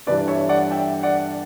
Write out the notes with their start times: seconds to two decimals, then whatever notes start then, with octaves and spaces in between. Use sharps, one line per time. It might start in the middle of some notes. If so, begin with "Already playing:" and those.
0.07 G1 G2 E3 G3 B4 D5
0.28 C#5 E5
0.49 D5 F#5
0.71 E5 G5
1.03 D5 F#5